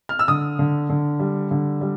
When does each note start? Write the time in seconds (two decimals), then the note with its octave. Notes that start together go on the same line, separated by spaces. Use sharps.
0.09 F6
0.19 E6
0.28 D3 D#6
0.59 D3
0.90 D3
1.19 G3
1.51 D3
1.81 G3